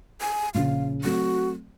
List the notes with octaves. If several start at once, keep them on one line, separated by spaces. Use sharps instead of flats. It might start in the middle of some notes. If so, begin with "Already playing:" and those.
G#5
A#1 C#3 F5
F#3 A3 C4 F#4